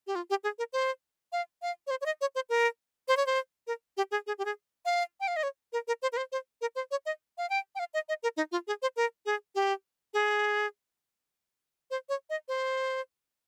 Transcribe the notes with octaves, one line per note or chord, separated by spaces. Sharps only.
G4
F4
G4
G#4
A#4
C5
F5
F5
C#5
C5
C#5
D#5
C#5
C5
A#4
C5
C#5
C5
A#4
G4
G#4
G#4
G4
G#4
F5
G5
F5
D#5
C#5
A#4
A#4
C5
A#4
C5
C5
A#4
C5
C#5
D#5
F5
G5
G5
F5
D#5
D#5
A#4
D#4
F4
G#4
C5
A#4
G#4
G4
G#4
C5
C#5
D#5
C5